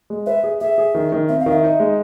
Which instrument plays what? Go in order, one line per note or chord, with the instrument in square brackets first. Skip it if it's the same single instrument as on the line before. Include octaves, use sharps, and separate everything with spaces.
[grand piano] G#3
[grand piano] B4 [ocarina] E5
[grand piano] G#4
[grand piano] G#4 [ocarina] E5
[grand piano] G#4
D#3
D#3
[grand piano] C4 [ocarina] E5
[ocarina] F5
[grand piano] D#3
[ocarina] E5
[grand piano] D#4
G#3